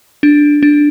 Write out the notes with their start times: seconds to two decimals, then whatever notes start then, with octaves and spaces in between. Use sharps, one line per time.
0.23 D4
0.63 D4